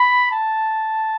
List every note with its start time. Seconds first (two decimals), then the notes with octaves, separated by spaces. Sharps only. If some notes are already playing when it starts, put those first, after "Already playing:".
Already playing: B5
0.29 A5